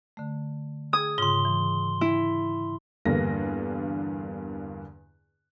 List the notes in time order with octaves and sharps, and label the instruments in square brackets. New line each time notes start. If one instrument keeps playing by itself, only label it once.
[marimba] D3 A3
[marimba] G#4 E6 G#6 [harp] D#6
[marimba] G#2 C#3 F4 [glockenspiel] C6 G7
[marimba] E3
[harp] E4
[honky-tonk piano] E2 G2 D3 A#3 A#6